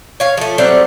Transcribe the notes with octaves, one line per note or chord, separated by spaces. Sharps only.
C#5 F5
F3 A3
F#3 G3 A3 C4